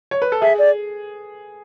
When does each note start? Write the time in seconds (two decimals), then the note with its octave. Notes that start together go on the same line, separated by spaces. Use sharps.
0.11 C#5
0.22 B4
0.32 A4
0.42 G#4 E5
0.59 D5